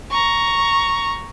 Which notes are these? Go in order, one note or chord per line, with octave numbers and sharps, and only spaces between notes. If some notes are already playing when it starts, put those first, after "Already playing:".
A#5 C#6